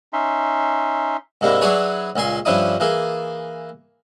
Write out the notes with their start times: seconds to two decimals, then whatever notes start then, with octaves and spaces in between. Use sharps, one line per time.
0.13 C#4 D#4 E5 C6
1.41 G#2 C3 A#3 D4 E4
1.61 F#3 D4 E4 G#4 B4 C#5
2.16 C#2 A#2 G#5 C6
2.45 G2 F3 C#4 D4 E4 D#6
2.80 E3 A#3 G#4